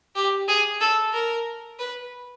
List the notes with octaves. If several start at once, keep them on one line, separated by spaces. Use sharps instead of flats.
G4
G#4
A4
A#4
B4